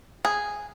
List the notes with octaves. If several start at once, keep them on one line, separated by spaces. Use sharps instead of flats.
G#4